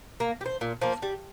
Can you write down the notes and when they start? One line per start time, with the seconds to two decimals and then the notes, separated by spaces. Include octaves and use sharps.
0.20 A#3
0.41 G4
0.46 C5
0.61 A#2
0.81 F3 A#3
1.02 G3